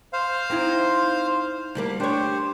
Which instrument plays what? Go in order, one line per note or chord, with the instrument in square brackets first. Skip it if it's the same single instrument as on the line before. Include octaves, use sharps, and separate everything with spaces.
[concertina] C5 F5
[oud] C4 D#4 E4
D2 G3 A#3
[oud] D4 C#5 [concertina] G4 C5